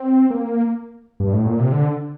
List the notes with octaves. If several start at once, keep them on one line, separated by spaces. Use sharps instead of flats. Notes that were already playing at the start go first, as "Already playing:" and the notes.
Already playing: C4
A#3
G2
A2
A#2
C3
D3